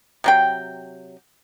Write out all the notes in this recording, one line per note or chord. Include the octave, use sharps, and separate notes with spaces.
C3 F#3 G5